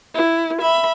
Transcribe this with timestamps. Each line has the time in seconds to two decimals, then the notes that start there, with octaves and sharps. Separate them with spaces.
0.14 E4
0.62 E5 B5